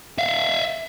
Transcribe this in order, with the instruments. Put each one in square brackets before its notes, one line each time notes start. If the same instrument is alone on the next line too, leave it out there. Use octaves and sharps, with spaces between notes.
[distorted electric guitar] E5 F5